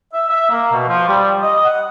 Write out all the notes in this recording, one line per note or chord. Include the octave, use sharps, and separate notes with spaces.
E5
E5
A#3
B2
F3
G3
D#5
F#5